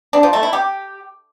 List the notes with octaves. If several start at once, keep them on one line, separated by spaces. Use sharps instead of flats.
D4
F3
A3
E4
G4